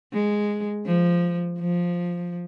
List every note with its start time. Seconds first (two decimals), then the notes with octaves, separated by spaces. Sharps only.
0.14 G#3
0.86 F3
1.59 F3